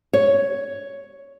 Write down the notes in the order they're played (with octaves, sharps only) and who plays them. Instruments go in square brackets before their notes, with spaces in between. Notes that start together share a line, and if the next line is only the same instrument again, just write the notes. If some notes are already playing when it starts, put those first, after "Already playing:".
[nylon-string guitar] C#5